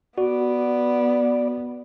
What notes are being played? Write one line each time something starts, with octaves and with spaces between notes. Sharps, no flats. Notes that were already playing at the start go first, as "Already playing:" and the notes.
B3 F#4 D5